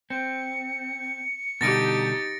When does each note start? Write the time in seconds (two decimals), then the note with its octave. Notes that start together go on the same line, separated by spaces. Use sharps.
0.10 C4 C#7
1.61 B2 D3 G3 D#4 G4 A6 A#6 D7